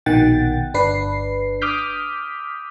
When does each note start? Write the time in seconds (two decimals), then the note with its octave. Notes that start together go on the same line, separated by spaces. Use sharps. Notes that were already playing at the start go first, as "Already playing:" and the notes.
0.06 A#1 B2 D#3 F#5 G5 A6
0.74 G1 D4 B4 C7
1.61 D6 D#6 F6 G6 B6